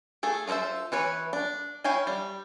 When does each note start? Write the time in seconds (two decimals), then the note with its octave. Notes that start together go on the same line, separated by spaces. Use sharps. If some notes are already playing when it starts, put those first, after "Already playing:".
0.23 A3 G#4 A4
0.47 F4 A4 A#4 C5 E5
0.92 E3 B4 C#5
1.33 D4
1.84 E4 C#5 F5 G5 G#5
2.07 G3